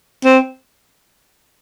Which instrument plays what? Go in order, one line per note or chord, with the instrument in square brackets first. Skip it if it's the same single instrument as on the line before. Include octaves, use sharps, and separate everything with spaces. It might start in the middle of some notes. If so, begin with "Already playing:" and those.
[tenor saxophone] C4